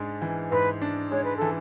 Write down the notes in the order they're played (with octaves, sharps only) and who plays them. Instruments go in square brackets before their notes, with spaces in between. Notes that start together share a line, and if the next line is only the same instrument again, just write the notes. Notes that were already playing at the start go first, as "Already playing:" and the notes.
Already playing: [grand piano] G#2 G#3 D4
E3
[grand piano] G#2 [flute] B4
[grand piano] D4
[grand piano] G#3 [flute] C#5
[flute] B4
[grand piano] E3 [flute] A4